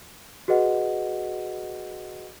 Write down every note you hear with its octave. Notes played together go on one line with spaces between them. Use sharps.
F#4 G#4 B4 D#5 F#5